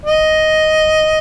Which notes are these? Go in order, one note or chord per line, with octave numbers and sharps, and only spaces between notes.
D#5